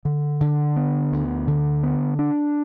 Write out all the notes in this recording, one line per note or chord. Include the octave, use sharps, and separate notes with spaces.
D3
D3
B3
D2
D3
B3
D4